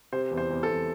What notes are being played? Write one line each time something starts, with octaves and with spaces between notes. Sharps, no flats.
C3 C5
E2
C5
E2
A4
E2